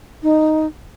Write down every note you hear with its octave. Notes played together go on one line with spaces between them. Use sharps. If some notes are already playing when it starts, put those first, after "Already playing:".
D#4